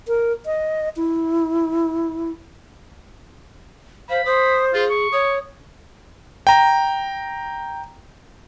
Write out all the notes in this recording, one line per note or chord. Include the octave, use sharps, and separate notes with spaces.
A#4
D#5
E4
C5 F5 B5
C5 D#6
F4 G#4
C#6
C#5 D#6
G5 A#5